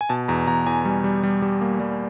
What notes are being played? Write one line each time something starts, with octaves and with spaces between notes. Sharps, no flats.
G#5
B2 A5
E2 A#5
E2 A#5
E2 G#5
G3
G3
G3
G3
A#3
G3